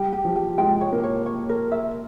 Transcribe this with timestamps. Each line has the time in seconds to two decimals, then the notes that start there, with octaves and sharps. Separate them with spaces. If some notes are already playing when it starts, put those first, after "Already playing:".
Already playing: G3 G5
0.13 G4
0.25 F3
0.36 G4
0.58 G#3 G5
0.81 C#5
0.92 A#3
1.04 C#5
1.26 C#5
1.49 A#4
1.72 E5